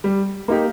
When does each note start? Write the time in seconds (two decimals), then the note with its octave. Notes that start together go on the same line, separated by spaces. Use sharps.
0.04 G3
0.48 A#3 D#4 G4